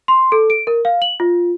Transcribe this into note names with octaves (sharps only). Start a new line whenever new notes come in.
C6
A4
D7
A#4
F5
F#7
F4